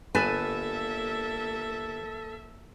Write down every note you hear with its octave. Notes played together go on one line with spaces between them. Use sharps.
G1 A#3 A4 B4 E5 G#5 A5